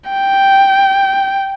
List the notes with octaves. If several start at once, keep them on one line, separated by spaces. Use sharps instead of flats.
G5